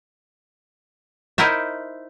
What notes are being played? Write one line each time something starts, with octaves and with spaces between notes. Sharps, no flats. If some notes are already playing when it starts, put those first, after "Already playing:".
D#4 E4 A#4 C5 E5